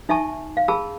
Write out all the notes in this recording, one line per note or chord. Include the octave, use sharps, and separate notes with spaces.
D#4 E5 G#5 A5 C#6
F5
G#4 A5 B5 E6